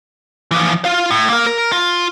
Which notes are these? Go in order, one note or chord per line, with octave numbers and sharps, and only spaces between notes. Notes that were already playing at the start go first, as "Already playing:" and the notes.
E3 F3
F4 F5
A2
A#3 A#4
A#4
F4